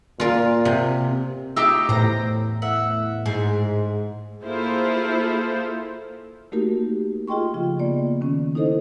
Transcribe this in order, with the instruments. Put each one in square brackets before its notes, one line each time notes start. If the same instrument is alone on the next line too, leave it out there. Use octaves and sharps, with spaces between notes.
[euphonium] A#2 [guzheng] F4 A#4
[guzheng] C3
[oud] D#4 F4 G4 [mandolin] E6
[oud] E2 [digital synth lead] A2 [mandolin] C5 G5 A#5
[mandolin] E5 F#5
[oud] G#2 [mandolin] G#4
[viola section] A#3 E4 F4 G#4 A4 C5
[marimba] A3 A#3 D#4 F#4 G4 A#4
F4 G#4 D#5 G5 C6 C#6
C#3 F3 F4
A#3 B3 D5
D#3 C#4
D#4 E4 A4 C5 D#5